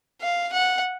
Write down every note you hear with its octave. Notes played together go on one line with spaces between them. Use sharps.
F5
F#5